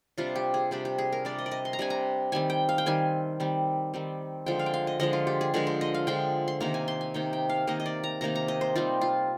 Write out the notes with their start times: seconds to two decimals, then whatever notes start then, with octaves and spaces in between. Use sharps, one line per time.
0.18 C3 G3 D4 F4
0.36 G4
0.54 G#4
0.71 C3 G3 D4 G4
0.85 G4
0.98 G#4
1.12 A#4
1.25 C3 G3 D4 D5
1.39 D#5
1.46 D5
1.51 D#5
1.65 C6
1.73 A#5
1.79 C3 G3 D4 G#5
1.90 A#5
2.32 D#3 G3 C4 G#5
2.50 G5
2.69 F5
2.78 G5
2.86 D#3 G3 C4 G#5
3.40 D#3 G3 C4
3.94 D#3 G3 C4
4.46 D3 F3 G#3 G5
4.59 F5
4.66 G5
4.74 F5
4.87 D#5
4.99 D3 F3 G#3 D#5
5.13 F4
5.27 G4
5.41 G#4
5.54 D3 F3 G#3 A#4
5.67 C5
5.81 D#5
5.94 F5
6.07 D3 F3 G#3 G5
6.48 C6
6.61 C3 D#3 A#3 D#4 A#5
6.74 G#5
6.88 C6
7.01 G#5
7.14 C3 D#3 A#3 D#4 G5
7.33 G5
7.49 F5
7.67 C3 D#3 A#3 D#4 D#5
7.80 D#5
7.86 D5
8.04 A#5
8.21 C3 D#3 A#3 D#4 A#5
8.35 A#5
8.48 D#5
8.61 C5
8.76 G3 C4 D#4 F4
9.01 F4